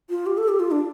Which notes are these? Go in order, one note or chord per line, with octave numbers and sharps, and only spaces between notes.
F4
G4
A4
G4
F4
D4